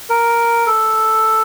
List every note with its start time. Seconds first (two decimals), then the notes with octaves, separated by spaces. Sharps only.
0.10 A#4
0.67 A4